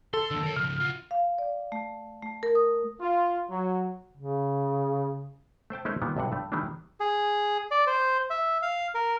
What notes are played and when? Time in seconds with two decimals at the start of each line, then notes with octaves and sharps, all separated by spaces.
0.14 A4 C6
0.31 D#2 D3
0.43 A#4 C#5
0.56 C#3 F3 F6
0.80 F4 F#4
1.11 F5
1.38 D5
1.72 A3
2.22 A3
2.43 A#4
2.55 D#6
3.01 F4
3.50 F#3
4.17 C#3
5.70 A3 C5 G5 A5
5.85 G#3 A3 C#4 D#4 A#4 C5
6.02 A#2 D#3 G3 B3
6.16 B1 G2 C3 F#5
6.32 G2 A3
6.52 D#3 E3 G3 A3 A#3 D4
7.00 G#4
7.71 D5
7.87 C5
8.30 E5
8.62 F5
8.94 A#4